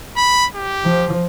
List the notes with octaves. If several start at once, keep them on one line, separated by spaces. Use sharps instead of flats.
B5
G4
F3